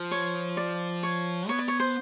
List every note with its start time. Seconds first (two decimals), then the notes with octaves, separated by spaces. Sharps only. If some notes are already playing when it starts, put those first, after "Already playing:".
Already playing: F3
0.11 C#5
0.57 D5
1.03 C#5
1.49 B3 C#5
1.59 D5
1.68 C#5
1.80 C5